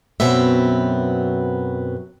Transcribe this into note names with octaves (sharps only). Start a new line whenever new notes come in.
F#2 B2 F#3 B3 C4 E5